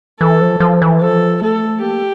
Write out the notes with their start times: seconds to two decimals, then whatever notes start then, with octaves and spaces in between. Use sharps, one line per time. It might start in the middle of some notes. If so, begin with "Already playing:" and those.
0.20 E3 A4
0.41 F3
0.60 F3
0.82 E3
1.01 F3 A4
1.42 A3 A4
1.81 A#3 G4